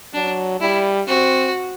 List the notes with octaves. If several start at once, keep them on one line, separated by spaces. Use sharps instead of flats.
F#3 D4
G3 E4
C4 F#4